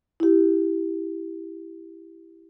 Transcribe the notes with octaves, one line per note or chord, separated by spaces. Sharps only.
E4 G4